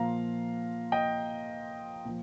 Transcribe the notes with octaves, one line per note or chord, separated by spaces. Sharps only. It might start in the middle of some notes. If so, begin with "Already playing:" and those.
Already playing: A#2 F3 F5 A#5
D#5 G5
A#2 F3